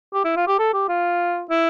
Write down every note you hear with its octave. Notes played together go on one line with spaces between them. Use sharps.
G4
E4
F4
G4
A4
G4
F4
E4